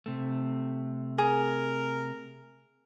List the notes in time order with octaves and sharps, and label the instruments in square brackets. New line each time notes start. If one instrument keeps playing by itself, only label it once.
[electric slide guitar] C3 A3
[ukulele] G#4 [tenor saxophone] A#4